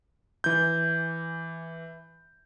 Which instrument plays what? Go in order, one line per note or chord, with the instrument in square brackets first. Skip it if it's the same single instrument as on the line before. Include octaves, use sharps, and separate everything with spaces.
[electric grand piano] E3 G6